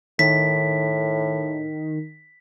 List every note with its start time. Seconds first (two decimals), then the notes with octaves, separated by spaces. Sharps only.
0.19 A2 D#3 B6